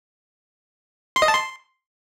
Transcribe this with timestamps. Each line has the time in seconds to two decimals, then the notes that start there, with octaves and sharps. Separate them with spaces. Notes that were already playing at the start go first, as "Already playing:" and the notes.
1.16 C6
1.22 D#5
1.28 A5
1.34 C6